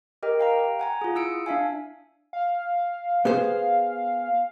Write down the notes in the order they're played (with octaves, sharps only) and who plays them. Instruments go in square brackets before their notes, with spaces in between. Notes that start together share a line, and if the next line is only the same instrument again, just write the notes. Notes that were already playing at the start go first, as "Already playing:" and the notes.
[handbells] G4 A#4 D#5 G5
F5 G5 A#5
F#5 G#5 A#5
F4 G#4
E4 D#6 E6 C#7 D7
D4 E5 F5 G#5
[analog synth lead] F5
[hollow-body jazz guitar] B3 G#4 C5